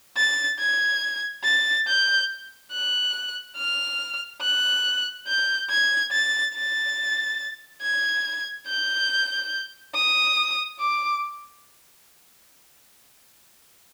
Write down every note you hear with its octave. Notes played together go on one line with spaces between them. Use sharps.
A6
G#6
A6
G6
F#6
F6
F#6
G6
G#6
A6
A6
G#6
G6
D#6
D6